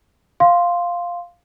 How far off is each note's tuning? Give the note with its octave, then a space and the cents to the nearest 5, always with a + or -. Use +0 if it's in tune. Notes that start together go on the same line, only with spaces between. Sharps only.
F5 +0 C6 +0